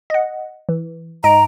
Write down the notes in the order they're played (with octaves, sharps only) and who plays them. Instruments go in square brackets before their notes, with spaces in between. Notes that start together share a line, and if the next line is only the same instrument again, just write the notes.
[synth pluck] D#5 F#5
E3
[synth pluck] G#2 D#5 D7 [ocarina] A#5